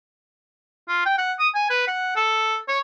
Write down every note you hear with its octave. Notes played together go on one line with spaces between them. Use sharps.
F4
G5
F#5
D#6
G#5
B4
F#5
A4
C#5